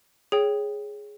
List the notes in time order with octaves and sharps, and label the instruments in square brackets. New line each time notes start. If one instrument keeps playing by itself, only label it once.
[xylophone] G#4 C#5 G5